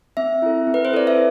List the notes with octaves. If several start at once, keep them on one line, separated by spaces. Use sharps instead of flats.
C4 E5
E4 A4
C4
B4
C5
E4 A4 D5
E5